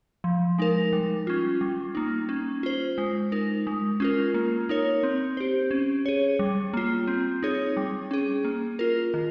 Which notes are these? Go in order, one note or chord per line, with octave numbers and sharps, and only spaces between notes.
F3
G#3 D#4 A#4
G3
C#4 F4
G3
A#3 D#4
C#4
F4 C5
G#3
D#4 A#4
G#3
C#4 F4 A#4
A#3
D#4 A#4 C#5
C4
G4 C5
C#4
G#4 C#5
G3
A#3 F4
C4
D#4 G#4 C#5
G3
C#4 G#4
A#3
F4 A#4
D#3